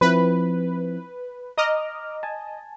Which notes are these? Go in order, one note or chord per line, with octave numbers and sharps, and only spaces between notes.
F3 C4 E4 B4
D#5 A#5 D6 F6
G#5 A5